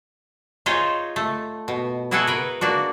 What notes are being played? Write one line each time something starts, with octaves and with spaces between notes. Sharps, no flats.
D#4 F4 G#4 C5 C#5
A3
B2
E4 F#4 G#4 A4 B4 F#5
A#4 B4
A#3 D4 F#4